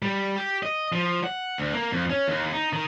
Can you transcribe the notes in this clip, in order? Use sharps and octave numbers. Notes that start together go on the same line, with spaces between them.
G3
G4
D#5
F3
F#5
D2
A#3
F2
C#4
D#2
D#4
D#3